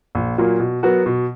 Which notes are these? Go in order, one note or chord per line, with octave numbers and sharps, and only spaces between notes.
A#1
A#2 F#3 A#3
B2
F#3 B3 F#4 A#4
B2